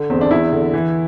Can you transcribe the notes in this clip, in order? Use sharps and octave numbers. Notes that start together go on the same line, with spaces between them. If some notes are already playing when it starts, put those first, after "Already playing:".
Already playing: D3
E2 C4
D4
E2 E4
D3
E3